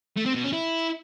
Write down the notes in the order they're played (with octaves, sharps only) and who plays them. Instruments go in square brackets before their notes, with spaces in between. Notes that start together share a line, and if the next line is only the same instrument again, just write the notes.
[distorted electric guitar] A3
C4
B2
C#4
E4